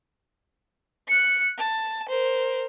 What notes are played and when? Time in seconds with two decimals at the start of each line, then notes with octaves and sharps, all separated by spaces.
1.08 F#6 C#7
1.58 A5
2.09 A#4 C5